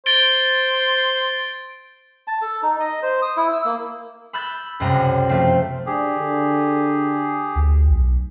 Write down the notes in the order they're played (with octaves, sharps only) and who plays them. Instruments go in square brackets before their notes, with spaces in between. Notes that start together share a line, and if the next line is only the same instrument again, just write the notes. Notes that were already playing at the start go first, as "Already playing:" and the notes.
[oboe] C5 [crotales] A6 D7 G7
[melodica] A5
A4
D#4
D#5
C5
D#6
E4
E6
A#3
[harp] B5 E6 F#6 G6 A6
C#2 F#2 C3 G3 A#5
F3 A3 C4
[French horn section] D4 [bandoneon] G4 G#4
[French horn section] D3
[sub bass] D2
B1